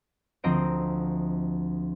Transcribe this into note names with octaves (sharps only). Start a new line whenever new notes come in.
D2 F3 C4 D#5 A#5 D7